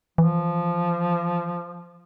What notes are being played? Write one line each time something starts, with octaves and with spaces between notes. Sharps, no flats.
E3 F3